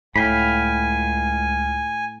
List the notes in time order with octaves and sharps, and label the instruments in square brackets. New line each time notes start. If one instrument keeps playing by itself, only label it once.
[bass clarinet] C#2 [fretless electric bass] A2 [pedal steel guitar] F5 G5 B5 [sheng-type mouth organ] G#5